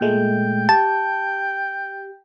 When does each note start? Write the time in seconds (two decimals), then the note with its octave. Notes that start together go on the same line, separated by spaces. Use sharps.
0.01 A#2 G#3 A3 G5
0.69 G4 A5